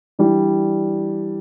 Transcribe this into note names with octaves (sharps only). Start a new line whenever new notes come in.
E3 G3 D4